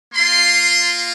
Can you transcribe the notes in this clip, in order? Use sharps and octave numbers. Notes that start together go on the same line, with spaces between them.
A#3 F4 C6